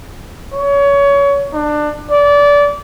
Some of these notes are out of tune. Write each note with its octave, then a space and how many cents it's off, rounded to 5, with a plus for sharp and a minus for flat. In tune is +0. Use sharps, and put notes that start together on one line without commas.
C#5 +25
D4 +25
D5 -25